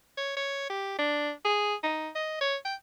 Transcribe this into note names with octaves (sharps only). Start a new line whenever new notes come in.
C#5
C#5
G4
D4
G#4
D#4
D#5
C#5
G5